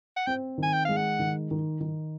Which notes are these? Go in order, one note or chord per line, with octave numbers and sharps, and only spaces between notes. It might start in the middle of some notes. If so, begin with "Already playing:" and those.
F#5
C4 G5
D#3
G#5
G5
G#3 F5
F#5
D#3
D#3
D#3